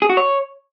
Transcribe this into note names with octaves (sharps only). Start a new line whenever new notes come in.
G#4
F#4
C#5